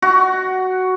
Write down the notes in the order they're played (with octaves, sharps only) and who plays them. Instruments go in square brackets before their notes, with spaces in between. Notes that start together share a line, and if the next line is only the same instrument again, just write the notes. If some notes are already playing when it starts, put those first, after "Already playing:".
[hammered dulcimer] F#4